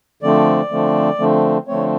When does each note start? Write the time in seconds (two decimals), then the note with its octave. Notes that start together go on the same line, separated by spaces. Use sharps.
0.23 D3 F3 A3 C4 D5
0.71 D3 F3 A3 C4
1.19 D3 F3 A3 C4
1.68 D3 F3 A3 C4 C#5